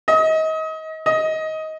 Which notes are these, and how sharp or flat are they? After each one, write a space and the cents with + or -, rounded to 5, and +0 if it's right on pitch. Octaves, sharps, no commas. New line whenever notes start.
D#5 +30
D#5 +15